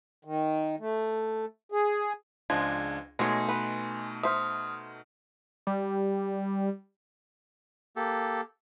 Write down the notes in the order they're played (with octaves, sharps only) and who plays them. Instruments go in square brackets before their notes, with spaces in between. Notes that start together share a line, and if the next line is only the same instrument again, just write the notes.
[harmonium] D#3
A3
G#4
[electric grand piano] C#2 D4 [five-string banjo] F3 G#3 [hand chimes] G#6
[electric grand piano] B2 A3 D#4 [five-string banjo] G#3 C#5 [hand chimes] G#5 C6 C#7
[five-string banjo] B4
[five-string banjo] C5 E5 [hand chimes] D#6 F6
[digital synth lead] G3
[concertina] A#3 G4 A4